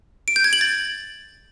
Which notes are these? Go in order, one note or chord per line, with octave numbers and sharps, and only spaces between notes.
D7
G6
G#6
F#7
A6